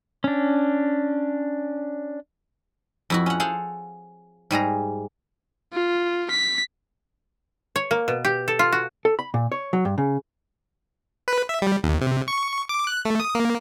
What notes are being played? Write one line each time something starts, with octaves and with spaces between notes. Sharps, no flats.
C#4 D4
F2 E4 F#4
C#4 F#5
G#4 A4 C5 F5 F#5
G#2 G3 G#4 A#5
F4
B6
C#5
A#3
B2
G4
A4
F4
F#4
A4
B5
A#2
C#5
F#3
G2
C#3
B4
E5
G3
D#2
C3
C#6
D6
F#6
A3
D#6
A#3